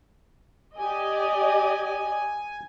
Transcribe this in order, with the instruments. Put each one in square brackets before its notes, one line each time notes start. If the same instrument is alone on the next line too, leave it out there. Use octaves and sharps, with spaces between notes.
[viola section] G4 D5 D#5 [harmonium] G#5